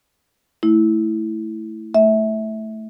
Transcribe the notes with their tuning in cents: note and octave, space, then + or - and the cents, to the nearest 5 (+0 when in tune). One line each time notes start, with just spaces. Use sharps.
A3 +0 E4 -10
A3 +0 E5 -20